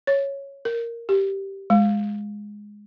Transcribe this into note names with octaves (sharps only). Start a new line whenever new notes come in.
C#5
A#4
G4
G#3